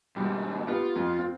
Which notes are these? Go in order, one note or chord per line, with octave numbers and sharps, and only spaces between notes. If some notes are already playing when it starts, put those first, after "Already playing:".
D#2 G#2 B2 G3
B3 F4 G4
F2
C4